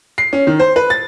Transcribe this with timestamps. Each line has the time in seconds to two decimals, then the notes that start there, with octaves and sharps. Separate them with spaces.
0.18 C7
0.33 C#4
0.47 D#3
0.59 C5
0.76 B4
0.90 A6